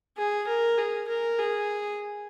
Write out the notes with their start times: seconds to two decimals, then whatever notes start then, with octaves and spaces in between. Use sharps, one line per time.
0.18 G#4
0.47 A#4
0.77 G#4
1.08 A#4
1.39 G#4